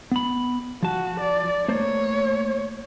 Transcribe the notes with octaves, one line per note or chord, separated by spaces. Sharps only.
B3 B5
F3 F#4 A5
D5
A3 A#3 C5 C#5